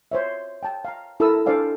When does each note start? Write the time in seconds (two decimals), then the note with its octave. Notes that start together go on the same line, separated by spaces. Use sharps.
0.12 C5 C#5 E5
0.63 G5 A5
0.85 F5 A#5
1.20 E4 A4 A#4 B5 D#6 E6
1.46 D4 A4 C5 D5 F5 G#5